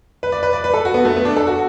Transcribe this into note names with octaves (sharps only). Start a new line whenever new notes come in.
B4
D5
B4
D5
B4
A4
F#4
B3
A3
B3
D4
A4
F#4